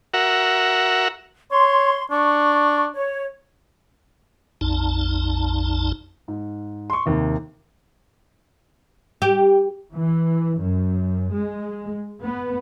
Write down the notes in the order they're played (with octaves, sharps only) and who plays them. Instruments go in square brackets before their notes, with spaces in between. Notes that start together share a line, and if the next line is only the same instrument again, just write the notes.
[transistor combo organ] F#4 A#4 E5 F#5
[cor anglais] C#5 [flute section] C6
[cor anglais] D4 [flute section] C#6
[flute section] C#5
[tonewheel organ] A#1 F2 D#4 A5
[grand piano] G#2
C6 C#6
D#2 C3
[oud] G4
[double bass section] E3
F#2
G#3
B3